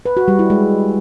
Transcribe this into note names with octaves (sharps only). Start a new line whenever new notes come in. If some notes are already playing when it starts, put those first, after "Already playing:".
B4
F#4
G3
E4
G#3